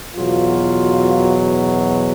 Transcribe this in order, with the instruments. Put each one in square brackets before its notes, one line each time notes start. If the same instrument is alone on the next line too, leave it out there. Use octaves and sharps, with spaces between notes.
[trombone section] E2 B2 F#3 F4